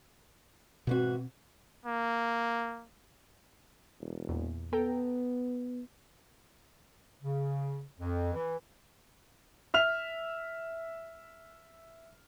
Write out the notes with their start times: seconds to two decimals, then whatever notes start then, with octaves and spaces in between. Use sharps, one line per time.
0.87 G#2 B2 E3 C4 F#4
1.86 A#3
4.00 E1
4.29 E2 A#2
4.73 B3 A4 G5 A#5
7.21 C#3
7.98 F2
8.34 E3
9.74 E5 F6 F7